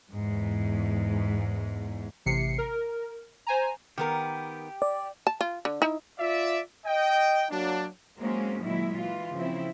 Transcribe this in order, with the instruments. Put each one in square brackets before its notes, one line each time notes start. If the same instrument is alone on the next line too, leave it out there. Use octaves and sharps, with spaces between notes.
[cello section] E2 G#2
[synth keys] A1 C3 C7 C#7
A#4
C5 G#5 A#5
[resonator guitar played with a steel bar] D#3 B3 A#4 [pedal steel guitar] G4
[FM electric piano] D5
[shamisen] A5
F4
D3
D#4 E4
[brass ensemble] F4 D5 E5
D#5 G5
F#3 A#3 D4
[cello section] F#3 G#3 A#3 C4 C#4
A#2 D#3 F#3 G#3 E4
E3 F4
C#3 F3 C4 E4